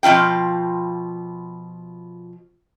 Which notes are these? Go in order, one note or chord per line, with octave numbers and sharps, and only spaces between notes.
B2 F3 E4 F4 G5